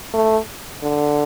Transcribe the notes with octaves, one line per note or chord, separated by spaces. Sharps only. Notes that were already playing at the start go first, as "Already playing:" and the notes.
A3
D3